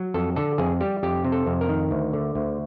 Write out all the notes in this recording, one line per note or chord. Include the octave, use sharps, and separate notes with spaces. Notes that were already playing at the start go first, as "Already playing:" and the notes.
Already playing: F#3
F2 A4
D3 A4
F2 G#4
G3 G4
F2 G4
C3
A4
F2
A#4
D#3
D2
D3
D2